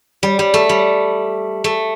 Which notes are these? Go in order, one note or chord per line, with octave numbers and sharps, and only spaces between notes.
G3
G3
A3
G3
A3